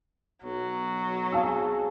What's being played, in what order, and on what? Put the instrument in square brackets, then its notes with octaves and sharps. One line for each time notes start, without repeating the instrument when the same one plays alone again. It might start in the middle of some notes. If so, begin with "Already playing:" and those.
[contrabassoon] B1 [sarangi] F#3
[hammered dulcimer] G#3 C4 G#4 [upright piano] F5 A5 E6